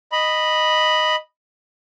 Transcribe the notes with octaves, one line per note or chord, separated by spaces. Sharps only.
D#5 B5